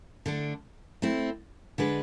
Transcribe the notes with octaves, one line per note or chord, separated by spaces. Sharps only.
D3 A3 D4
A3 C4 E4
D3 G#3 D4 G#4 B4